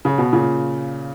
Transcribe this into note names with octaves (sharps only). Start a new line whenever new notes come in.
C#3
B2
A#2 C#3